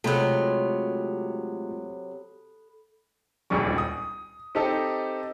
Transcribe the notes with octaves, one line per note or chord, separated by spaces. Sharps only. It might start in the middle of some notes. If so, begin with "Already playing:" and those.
C3 F#3 G#3 A3 F4 A4 B5 F#6
D#1 G#1 C#2 G3 C#6
D#6
C4 D#4 G4 A4 D#5 A5